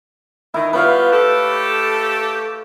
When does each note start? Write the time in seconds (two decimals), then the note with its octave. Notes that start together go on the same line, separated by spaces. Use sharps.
0.54 D#3 E4
0.73 G3 B3 F4 B4 C#5 F5
1.12 A3 G4 A4